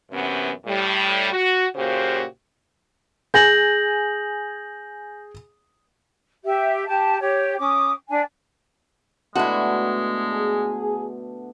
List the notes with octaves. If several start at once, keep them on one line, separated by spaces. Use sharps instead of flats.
F#2 C3 E3 B3 C#4
A2 G3
F#4
A#2 C#3 F#4 G4 C5
G#4 G#5 G6 A#6 F#7
G4 E5
G4 A5
G4 C#5
C#4 D6 D#6
D4 G#5
B2 D3 G#3 A3 E4 F#4
G#4